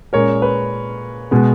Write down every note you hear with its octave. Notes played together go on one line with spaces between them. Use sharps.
A#2 G#3 C#4 A#4 C#5
B4
B2 G#3 B3